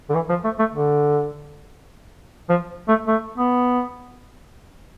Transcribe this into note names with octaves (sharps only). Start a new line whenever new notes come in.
D3
E3
F3
A3
A3
D3
F3
A3
A3
B3